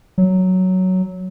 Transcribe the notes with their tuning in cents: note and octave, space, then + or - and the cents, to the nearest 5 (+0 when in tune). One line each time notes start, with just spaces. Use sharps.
F#3 +5